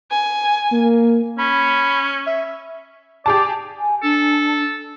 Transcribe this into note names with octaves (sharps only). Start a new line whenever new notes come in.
G#5
A#3
C#4 B5
E5
G4 G#4 D5 A5
G#5
D4 A4